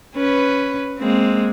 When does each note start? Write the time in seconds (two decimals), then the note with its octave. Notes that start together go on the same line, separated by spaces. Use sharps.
0.15 C#4 B4
0.98 G#3 A#3 C4